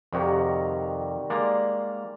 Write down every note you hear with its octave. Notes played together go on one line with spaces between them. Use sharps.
F2 C3 D#3 G3 F#4
G#3 A#3 D5 A#5 C6